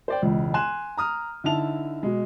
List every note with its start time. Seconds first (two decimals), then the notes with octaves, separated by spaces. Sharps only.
0.08 C5 D5 G5
0.22 E1 C#2
0.54 G#5 C6 F#6 E7
0.97 A#5 D#6 F6
1.44 D3 D#4 E4 A5 F7
2.03 B2 G#3